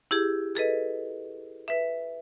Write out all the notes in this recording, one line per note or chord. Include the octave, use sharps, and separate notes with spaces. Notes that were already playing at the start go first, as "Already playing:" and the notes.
E4 G4 G#4
G#4 A4 B4 D#5
B4 E5